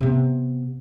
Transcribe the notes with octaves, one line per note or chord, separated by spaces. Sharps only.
C3 B3